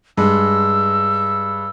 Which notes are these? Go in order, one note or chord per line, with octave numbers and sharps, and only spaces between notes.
G2 G#3 E6